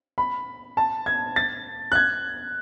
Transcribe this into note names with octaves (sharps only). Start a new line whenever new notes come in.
B5
A5
G#6
A6
F#6
G#6